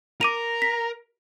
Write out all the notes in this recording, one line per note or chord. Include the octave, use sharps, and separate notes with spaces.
A#4 A#5 D6 D#7 F7
B6